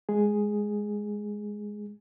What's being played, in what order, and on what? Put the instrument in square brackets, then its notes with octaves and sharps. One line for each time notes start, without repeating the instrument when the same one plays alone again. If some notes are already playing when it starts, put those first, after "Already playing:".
[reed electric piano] G#3 G#4